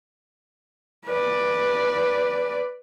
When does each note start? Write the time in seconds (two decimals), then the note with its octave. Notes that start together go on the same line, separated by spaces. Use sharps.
1.06 B4 D5